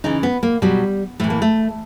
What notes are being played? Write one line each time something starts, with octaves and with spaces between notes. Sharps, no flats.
C#3 E3 D#4
B3
A#3
B2 F#3 G3
A2 E3 A3
A#3
A3